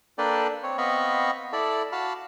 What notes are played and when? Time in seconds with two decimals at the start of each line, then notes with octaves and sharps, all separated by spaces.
0.18 A#3 D4 A4 B4 D5 G5
0.63 C4 C#5
0.78 B3 C4 D#5 F5 B5 C#6
1.53 E4 A4 D5 B5
1.92 F#4 F5 A5 B5